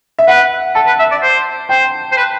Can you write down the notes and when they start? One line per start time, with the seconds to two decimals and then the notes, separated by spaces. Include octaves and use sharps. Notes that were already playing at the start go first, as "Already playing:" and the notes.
0.19 E5
0.28 B4 F#5
0.75 A4 A5
0.86 B4
0.99 E5
1.11 D5
1.22 C5
1.69 C5 G5
2.12 C5
2.17 B4